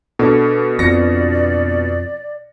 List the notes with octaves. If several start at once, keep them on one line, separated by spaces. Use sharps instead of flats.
B2 D4 A4
F2 D5 A#6 C#7